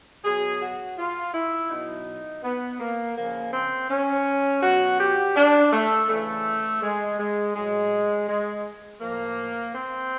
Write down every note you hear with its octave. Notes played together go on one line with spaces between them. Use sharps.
B2 F#3 G#4
F#4
F4
E4
B2 F#3 D#4
B3
A#3
C#3 F3 A#3
C4
C#4
B2 F#3 F#4
G4
D4
A3
C#3 E3 A3
G#3
G#3
A2 F#3 G#3
G#3
A2 F3 A#3
C4